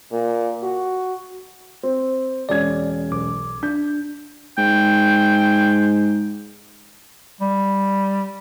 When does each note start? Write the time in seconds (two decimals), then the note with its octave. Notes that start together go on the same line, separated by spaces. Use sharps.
0.12 A#2
0.63 F#4
1.83 C4
2.49 E1 C#4 D5 G#6
3.12 B1 D6
3.63 D4 G6
4.58 G#2 G5
7.41 G3